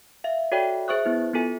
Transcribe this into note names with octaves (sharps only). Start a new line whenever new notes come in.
E5 F5
F#4 A4 C#5 D5 E5 G5
G#4 C5 E5 C#6 D#6 F#6
B3 E4 B4
B3 F4 A4 G#5